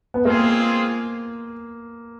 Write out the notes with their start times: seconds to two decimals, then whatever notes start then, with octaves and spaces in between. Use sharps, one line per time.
0.14 B3
0.25 G#3 A#3 C4 F4 G#4